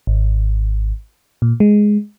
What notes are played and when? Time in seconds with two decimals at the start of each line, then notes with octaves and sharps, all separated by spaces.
0.07 G#1
1.42 A#2
1.60 G#3